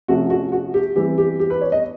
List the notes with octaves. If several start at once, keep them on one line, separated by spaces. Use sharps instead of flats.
C3 F3 A3 C#4 F#4
F#4
F#4
G4
E3 G3 C4 G4
G4
G4
B4
C#5
D#5